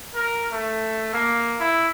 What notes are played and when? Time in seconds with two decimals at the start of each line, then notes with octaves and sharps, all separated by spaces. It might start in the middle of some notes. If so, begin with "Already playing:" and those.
0.15 A#4
0.52 A3
1.13 A#3
1.60 E4